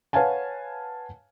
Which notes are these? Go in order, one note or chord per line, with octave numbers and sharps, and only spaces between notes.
B4 C#5 F5 F#5 G#5 A5